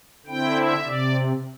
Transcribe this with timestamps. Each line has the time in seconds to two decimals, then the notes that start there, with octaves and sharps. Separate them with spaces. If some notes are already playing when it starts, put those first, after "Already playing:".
0.26 D3 C4 E4 G5
0.57 E5
0.85 C3 D5